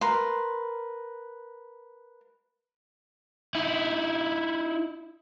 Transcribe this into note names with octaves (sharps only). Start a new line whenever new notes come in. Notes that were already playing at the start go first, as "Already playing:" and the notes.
A#4 B4 C6
D#4 E4